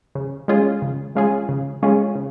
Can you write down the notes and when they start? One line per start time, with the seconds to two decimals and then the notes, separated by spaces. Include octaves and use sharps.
0.15 C#3
0.48 G#3 C#4 F4 G#4
0.82 C#3
1.15 G#3 C#4 F4 G#4
1.49 C#3
1.83 G#3 C#4 F4 G#4
2.15 C#3